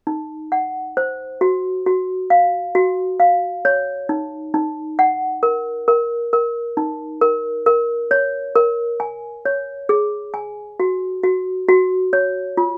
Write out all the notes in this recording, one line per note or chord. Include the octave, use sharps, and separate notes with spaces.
D#4
F#5
C5
F#4
F#4
F5
F#4
F5
C#5
D#4
D#4
F#5
A#4
A#4
A#4
D#4
A#4
A#4
C#5
A#4
G#5
C#5
G#4
G#5
F#4
F#4
F#4
C#5
F4